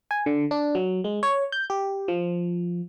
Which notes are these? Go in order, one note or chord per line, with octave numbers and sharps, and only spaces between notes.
G#5
D3
D4
F#3
G#3
C#5
G6
G4
F3